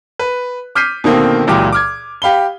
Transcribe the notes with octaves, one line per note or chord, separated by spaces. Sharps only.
B4
D6 F6 G6 B6 C7 D#7
B2 D3 D#3 A#3 C4
C#2 A#2 E3 F#3 G4 D6
D6 F6 G#6
G4 F5 B5 G7